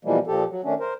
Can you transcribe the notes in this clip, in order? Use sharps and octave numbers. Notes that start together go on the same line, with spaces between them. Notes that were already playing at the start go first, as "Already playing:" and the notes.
B2 E3 F3 G3 G#3 A#3
A#2 F3 G4 A4
F#3
D#3 A3 C#4 D4
A#4 C5